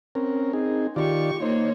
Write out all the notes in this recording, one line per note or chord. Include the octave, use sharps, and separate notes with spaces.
C4 C#4 A#4
C4 D#4 G#4
D#3 F4 G4 D5 C#6
A#3 D#4 C5 C#5